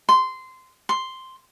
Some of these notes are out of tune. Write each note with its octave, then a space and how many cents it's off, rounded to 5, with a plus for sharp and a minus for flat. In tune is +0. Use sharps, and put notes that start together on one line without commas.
C6 -15
C6 +0